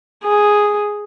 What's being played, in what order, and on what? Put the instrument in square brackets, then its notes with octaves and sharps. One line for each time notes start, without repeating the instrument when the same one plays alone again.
[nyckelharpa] G#4